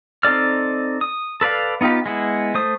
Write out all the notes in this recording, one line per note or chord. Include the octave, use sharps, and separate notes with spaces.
C4 D#4 A4 D5 F6
D#6
A4 B4 D5 F5
B3 D#4 F4 G4 B4
G#3 B3 E4
A3 C5 D#6